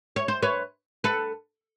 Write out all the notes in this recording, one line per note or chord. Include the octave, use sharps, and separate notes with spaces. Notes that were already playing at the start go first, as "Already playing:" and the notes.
C#5
C5
B4 C#5
A4 B4